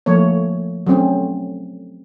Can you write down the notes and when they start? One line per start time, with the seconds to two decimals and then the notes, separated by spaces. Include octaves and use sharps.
0.06 F3 A3 A#3 C#5
0.87 F#3 A3 C4 C#4